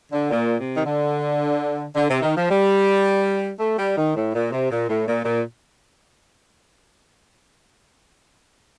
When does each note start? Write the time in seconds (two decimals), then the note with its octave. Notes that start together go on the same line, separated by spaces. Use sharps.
0.12 D3
0.30 A#2
0.58 C3
0.77 D#3
0.85 D3
1.95 D3
2.09 C3
2.22 D#3
2.36 F3
2.50 G3
3.60 A3
3.78 G3
3.97 D#3
4.15 A2
4.33 A#2
4.51 C3
4.70 A#2
4.88 A2
5.07 A#2
5.25 A#2